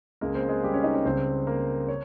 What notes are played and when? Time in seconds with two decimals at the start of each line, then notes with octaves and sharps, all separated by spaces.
0.21 C#2 C#3 G#3 A#3 A#4
0.35 C4 C5
0.49 G#3 G#4
0.64 G3 G4
0.74 C#4 C#5
0.84 D#4 D#5
0.95 C#4 C#5
1.05 C#2 C#3 G3 C4 C5
1.47 A#3 A#4
1.88 C#5